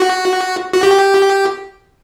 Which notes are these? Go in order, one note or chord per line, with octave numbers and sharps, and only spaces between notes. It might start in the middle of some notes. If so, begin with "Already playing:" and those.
Already playing: F#4
F#4
G4